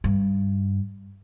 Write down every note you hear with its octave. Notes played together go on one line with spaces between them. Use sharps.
G2